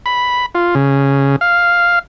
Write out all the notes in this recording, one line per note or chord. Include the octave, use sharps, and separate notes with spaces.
B5
F4
C#3
F5